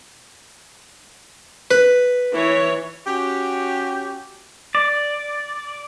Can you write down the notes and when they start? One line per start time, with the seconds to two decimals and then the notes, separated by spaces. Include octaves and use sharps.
1.71 B4
2.32 E3 C#5
3.07 C#4 F#4 G4
4.75 D5